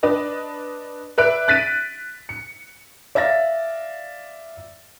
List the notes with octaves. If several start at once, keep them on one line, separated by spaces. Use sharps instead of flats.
D4 B4 D5 D#5
B4 D5 E5 F#6 D7
F#6 A6 B6 D7 D#7
C#7
D5 E5 F5 A6 A#6